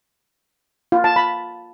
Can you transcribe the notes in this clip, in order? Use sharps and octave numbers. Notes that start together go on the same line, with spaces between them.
F4
A5
B5